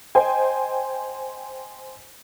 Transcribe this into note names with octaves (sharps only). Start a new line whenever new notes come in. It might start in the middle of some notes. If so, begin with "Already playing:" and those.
C5 D#5 G5 G#5